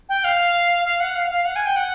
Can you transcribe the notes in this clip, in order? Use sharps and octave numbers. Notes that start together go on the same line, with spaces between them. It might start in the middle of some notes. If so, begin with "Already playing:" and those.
G5
F5
F5
F#5
F5
F5
F#5
G#5
G5
F#5